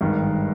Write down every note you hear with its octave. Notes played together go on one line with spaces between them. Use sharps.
G#1 G2 D#3 G3